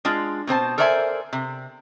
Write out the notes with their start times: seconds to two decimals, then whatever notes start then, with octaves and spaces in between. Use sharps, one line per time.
0.05 G#3 D4 F4
0.47 B2 C4 C5 A5
0.78 A4 A#4 C5 D5 E5 G#5
1.33 C3